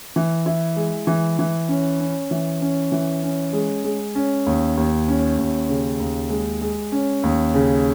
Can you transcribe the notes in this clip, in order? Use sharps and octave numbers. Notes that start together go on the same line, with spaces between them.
E3
E4
G#3
E3
E3
C#4
C#4
E3
C#4
E3
C#4
G#3
G#3
C#4
D#2
D#2
C#4
D#2
C#3
D#2
G#3
G#3
C#4
D#2
C#3